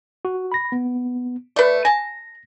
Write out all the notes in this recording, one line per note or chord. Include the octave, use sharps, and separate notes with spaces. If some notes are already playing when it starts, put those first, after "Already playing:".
F#4
B5 A#6
B3
A3 B4 D5
G#5 A5 A#6